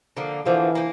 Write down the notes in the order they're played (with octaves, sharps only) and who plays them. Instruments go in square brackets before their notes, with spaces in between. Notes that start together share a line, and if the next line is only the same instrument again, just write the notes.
[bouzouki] D3 F3 A#3
[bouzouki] D3 F3 A#3 [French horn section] E3
[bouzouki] F3 A#3